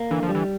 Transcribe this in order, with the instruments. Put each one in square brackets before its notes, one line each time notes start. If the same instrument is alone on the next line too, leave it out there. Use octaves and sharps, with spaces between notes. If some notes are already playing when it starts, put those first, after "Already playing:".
Already playing: [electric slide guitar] A#3
[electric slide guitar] D3 [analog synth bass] E3
[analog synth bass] F3
[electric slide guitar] G3
[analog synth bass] E3